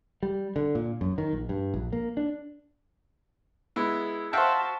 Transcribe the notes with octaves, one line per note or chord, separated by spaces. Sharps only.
G3
D3
A#2
F#2
D#3
A#1
G2
A#1
A#3
D4
G#3 B3 E4
F#4 C5 E5 F5 G5 A5